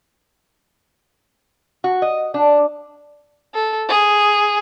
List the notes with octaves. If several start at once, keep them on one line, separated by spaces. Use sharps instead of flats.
F#4
D#5
D4
A4
G#4